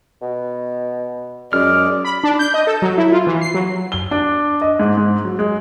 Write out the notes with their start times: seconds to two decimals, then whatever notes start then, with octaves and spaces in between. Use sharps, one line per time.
0.22 B2
1.53 F#2 G#3 D5 F6
2.05 B5
2.24 D4
2.39 G6
2.54 D#5
2.67 A4
2.82 F#3
2.98 E4
3.12 F4
3.27 E3
3.41 C7
3.54 F#3
3.92 G7
4.11 D4
4.62 D#5
4.80 G#2
4.97 G#2
5.25 F#3
5.39 G#3